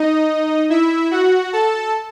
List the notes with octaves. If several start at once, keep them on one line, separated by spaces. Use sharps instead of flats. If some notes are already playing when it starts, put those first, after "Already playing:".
Already playing: D#4 D#5
E4 E5
F#4 F#5
A4 A5